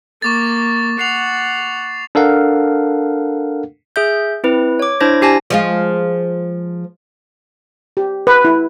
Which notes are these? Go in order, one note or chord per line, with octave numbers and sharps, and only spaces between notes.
A#3 C#6 D6 A6
F#5 C7 F7
D4 A4 A#4 F5 F#5
G#4 E5 G6
C4 E4 B4
C#5 D6
D4 E4 C5 G#6 A#6
D4 G4 G#5 A5 A#6
F3 G#3 F4
G4
B4
E4